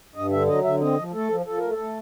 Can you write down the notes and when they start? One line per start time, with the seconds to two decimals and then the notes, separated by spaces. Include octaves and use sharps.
0.15 G2 D#5
0.31 D3 E5
0.48 F#3 D#5
0.64 D3 E5
0.81 C4 D#5
0.97 F3
1.13 A3 A4
1.29 F3
1.46 F3 A4
1.58 A3 A#4
1.70 A4
1.78 A3